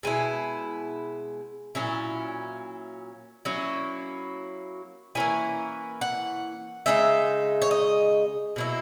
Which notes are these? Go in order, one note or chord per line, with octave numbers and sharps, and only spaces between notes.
B2 G#3 E4 G#5
A#2 F#3 C#4 E4
F#3 A#3 C#4 E4
E3 A#3 C#4 E4 G#5
F#5
C#3 G#3 D#4 E5
C#5
D#5
B2 F#3 A#3 E4